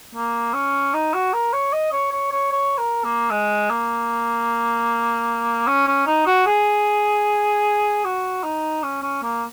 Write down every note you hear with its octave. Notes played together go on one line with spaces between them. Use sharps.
A#3
C#4
D#4
F#4
A#4
C#5
D#5
C#5
C#5
C#5
C#5
A#4
A#3
G#3
A#3
C#4
C#4
D#4
F#4
G#4
F#4
D#4
C#4
C#4
A#3